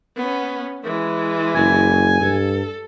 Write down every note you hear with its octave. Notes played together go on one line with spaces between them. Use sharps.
B3 C#4
E3 G#3
F#1 G#5
G2 A4